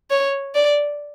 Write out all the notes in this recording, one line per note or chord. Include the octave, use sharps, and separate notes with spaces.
C#5
D5